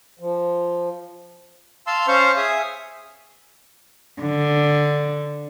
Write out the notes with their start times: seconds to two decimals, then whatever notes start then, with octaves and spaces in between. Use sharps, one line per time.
0.19 F3
1.87 F5 A5 C6 E6
2.08 C#4 C5 F5 C#6
2.37 G#4 E5 G#5 D#6
4.21 D3